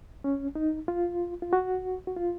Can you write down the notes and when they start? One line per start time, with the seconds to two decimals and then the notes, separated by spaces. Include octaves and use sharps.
0.24 C#4
0.55 D#4
0.88 F4
1.42 F4
1.53 F#4
2.07 F#4
2.17 F4